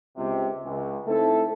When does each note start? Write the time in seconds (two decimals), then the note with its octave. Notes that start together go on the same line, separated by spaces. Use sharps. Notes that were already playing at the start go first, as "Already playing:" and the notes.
0.17 C#2 C3
0.65 C#2
1.07 A3 C4 D#4 E4 A4